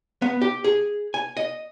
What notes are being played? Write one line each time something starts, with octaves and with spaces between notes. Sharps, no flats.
B3
G4
G#4
G#5
D#5